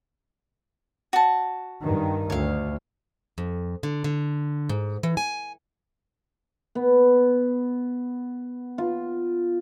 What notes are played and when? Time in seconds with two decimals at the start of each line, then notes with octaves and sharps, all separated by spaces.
1.13 F#4 A5
1.81 G2 D#3
2.30 D2 C#5 F5
3.38 F2
3.83 D3
4.04 D3
4.69 G#2
5.03 E3
5.17 G#5
6.75 B3
8.78 F4